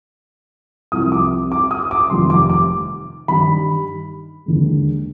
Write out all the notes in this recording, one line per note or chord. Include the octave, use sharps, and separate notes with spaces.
C2 C3 F3 D#6
D6
D6
D#6
D6
F1 F2 D#3 G3 C6
D6
D6
G2 D#3 G3 B5
D#2 D3 G#3